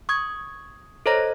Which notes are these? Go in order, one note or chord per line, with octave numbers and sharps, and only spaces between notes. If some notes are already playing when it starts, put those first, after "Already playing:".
C#6 D#6 G#6
A4 C5 C#5 D#5 A#5 A#6